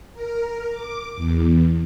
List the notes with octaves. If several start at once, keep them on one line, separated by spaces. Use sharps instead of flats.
A#4
D6
E2